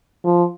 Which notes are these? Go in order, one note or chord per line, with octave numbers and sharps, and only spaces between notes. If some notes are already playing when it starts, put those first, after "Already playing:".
F3